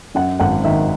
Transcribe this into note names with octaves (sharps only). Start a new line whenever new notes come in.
F#2 F#5
G#1 F#5
D#3 E5